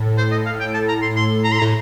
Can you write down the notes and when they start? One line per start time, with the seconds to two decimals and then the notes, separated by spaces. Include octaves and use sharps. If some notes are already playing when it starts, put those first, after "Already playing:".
Already playing: A2
0.18 C5
0.32 D#5
0.46 F5
0.60 G5
0.74 A5
0.88 A#5
1.02 C6
1.16 C6
1.44 A#5
1.52 C6
1.59 A2 A#5